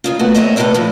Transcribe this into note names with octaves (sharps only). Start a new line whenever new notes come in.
C#3 D#4 F4
A3 B3 F#4
D#2 A3 C4 C#5 D#5 E5
F2 C3 A3 D#4 A4 B4
A2 F3